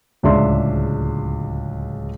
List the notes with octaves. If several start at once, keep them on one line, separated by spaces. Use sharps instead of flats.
D1 C#2 G#3 D4 E5 C6